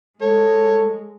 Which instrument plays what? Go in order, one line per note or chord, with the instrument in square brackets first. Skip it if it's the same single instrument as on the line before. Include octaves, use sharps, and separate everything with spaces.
[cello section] G#3 [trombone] A4 [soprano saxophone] C#5